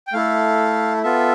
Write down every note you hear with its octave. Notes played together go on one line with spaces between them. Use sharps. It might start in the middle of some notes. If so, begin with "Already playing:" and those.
G5
A3 E4 A4 F5
B3 F4 A4 E5